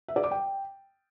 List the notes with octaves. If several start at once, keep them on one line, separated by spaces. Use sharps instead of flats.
E5
D5
D6
G5